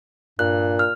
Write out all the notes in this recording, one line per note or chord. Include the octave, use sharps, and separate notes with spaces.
G2 A#2 F#6
F6